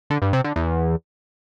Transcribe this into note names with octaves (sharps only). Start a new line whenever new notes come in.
D3
G2
C3
D3
E2